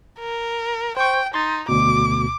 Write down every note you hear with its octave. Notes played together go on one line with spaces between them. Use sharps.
A#4
C5 G5 C#6
D#4 C6 A6
D2 B2 D6